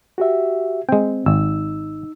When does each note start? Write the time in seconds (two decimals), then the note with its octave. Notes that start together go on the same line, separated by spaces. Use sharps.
0.18 F#4 G4 E5
0.89 G#3 C4 G5
1.26 G#1 D#4 E6